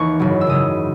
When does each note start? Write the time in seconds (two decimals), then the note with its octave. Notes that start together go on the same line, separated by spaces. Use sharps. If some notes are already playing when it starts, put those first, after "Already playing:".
Already playing: D#2 E3 C#6
0.19 G#1 F#2 C#3 F#3
0.41 E6
0.47 G#1 F#2 C#3 F#3 D#6